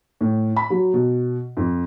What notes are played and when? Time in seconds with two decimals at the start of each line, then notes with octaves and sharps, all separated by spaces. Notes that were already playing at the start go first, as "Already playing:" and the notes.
0.21 A2
0.56 B5
0.70 F#3
0.94 B2
1.57 F2